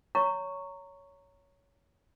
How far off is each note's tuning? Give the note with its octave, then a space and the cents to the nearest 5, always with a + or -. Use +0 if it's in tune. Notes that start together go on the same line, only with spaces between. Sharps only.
C#5 +15 A#5 -20 C#6 +0